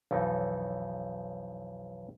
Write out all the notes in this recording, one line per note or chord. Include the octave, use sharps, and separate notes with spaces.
B1 F2 E3 D#4